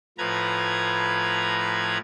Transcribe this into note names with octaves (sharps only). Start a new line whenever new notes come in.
A2 F3 B4 A#5 G#6